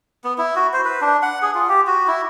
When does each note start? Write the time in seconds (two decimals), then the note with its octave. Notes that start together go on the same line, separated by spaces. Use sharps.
0.24 B3
0.38 E4
0.56 F#4
0.73 C5
0.85 B4
1.01 D4
1.23 F#5
1.42 G#4
1.55 F4
1.69 G4
1.87 F#4
2.08 E4